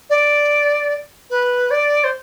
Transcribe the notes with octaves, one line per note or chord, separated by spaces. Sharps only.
D5
B4
D5
C5